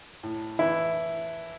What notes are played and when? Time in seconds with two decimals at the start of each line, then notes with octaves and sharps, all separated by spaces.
0.23 A2
0.59 E3 E4